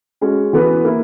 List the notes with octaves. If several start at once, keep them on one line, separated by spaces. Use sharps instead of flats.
G#3 C#4 F#4
E3 B3 F#4 B4
A#3 E4 A#4